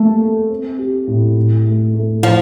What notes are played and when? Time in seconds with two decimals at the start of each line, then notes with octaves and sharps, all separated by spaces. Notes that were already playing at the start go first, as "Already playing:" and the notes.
Already playing: G3 A3 A#3
0.22 A#3
0.50 C4
0.79 G4
1.07 A2
1.37 A2
1.65 A3
1.94 A3
2.22 F3 E4